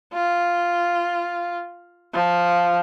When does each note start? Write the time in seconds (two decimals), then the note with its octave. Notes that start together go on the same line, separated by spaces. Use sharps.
0.13 F4
2.14 F3